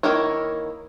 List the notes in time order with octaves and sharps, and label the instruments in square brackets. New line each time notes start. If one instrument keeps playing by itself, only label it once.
[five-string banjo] D#3 A#3 E4 A#4 C#5